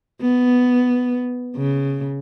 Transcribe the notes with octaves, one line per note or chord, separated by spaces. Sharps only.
B3
C#3